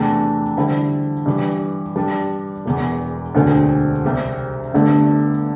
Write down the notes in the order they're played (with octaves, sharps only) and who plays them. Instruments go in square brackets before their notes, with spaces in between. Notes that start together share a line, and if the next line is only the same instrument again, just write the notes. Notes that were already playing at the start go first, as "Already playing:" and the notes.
Already playing: [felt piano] E2 C3 E3 A3 D4
D3 G3 E4 C5
G2 E3 G3
G2 G3 D4
E1 E2 E3
E1 D2 D3 C4
C2 C3 G3 C4 G4
G1 G2 D3 A3